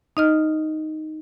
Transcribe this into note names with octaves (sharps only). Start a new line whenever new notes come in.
D#4 D#5 F6